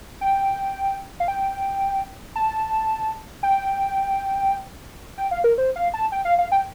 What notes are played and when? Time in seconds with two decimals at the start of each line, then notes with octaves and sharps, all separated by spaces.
0.21 G5
1.20 F5
1.28 G5
2.36 A5
3.43 G5
5.18 G5
5.31 F5
5.44 A#4
5.58 C5
5.76 F5
5.94 A5
6.12 G5
6.25 F5
6.39 F5
6.52 G5